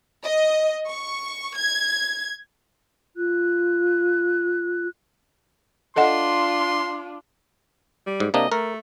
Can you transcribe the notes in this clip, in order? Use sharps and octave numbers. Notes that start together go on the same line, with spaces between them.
D#5
C#6
G#6
F4 F#6
D4 F4 A4 D#5 F#5 C6
G3
G#2
C3 A#3 D4 D#5
A3 A#4